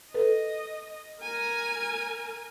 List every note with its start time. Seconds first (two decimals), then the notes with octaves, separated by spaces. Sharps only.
0.14 A4 B4 D#5
1.22 A#4 G#5